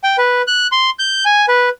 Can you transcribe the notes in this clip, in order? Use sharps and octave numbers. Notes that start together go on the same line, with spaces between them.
G5
B4
F#6
C6
G6
G#5
B4